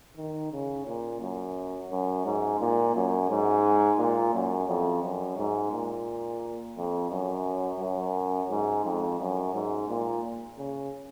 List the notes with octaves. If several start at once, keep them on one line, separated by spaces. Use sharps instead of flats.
D#3
C#3
A#2
F#2
F#2
G#2
A#2
F#2
G#2
A#2
F#2
F2
F#2
G#2
A#2
F2
F#2
F#2
G#2
F2
F#2
G#2
A#2
C#3